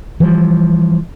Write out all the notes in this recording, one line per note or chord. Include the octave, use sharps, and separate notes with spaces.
E3 F3 G3